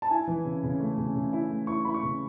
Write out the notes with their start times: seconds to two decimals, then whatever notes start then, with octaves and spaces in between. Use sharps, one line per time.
0.02 A5
0.10 E4 G#5
0.27 E3
0.45 C#3
0.64 C#3
0.80 A3
0.98 C#3
1.16 C#3
1.33 E4
1.50 A3
1.67 E4 C#6
1.85 E4 B5
1.94 C#6
2.03 C#3